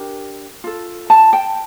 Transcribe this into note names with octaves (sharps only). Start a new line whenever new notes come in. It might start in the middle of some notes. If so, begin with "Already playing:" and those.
Already playing: D4 G4 A#4
F4 A4
A5
G5